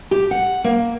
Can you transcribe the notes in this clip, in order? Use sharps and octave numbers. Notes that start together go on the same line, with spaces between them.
G4
F#5
A#3